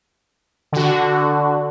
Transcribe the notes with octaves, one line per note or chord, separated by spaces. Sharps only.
D3 F#4